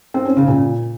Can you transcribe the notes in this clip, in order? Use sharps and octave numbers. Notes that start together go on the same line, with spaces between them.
C4
C#4
C#3
A#2